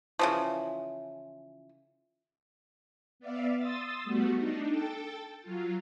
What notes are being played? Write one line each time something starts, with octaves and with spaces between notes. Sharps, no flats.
C#3 E3 F3
B3 D5 E5 F5
C6 D#6 E6 A6
G3 A3 B3 F#4
D4 D#4
A4 G5 A5
F#3 F4